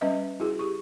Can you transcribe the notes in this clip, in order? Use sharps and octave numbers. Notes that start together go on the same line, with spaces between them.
G3 C#4 B4 D#5 E5
E4 F#4 G#4
G4 C#6